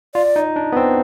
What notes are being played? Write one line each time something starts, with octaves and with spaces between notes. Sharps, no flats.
F4 D5
D#4
D4
B3
C4